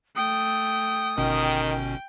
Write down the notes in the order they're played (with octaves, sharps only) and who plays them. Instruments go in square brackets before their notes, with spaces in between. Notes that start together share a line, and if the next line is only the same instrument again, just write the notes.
[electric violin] A3 G5 [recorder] D#6
[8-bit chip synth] G1 B2 C#4 [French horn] D#3 [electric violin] G5